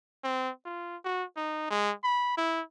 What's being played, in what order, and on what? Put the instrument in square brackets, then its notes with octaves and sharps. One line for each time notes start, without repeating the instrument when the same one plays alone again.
[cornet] C4
F4
F#4
D#4
G#3
B5
E4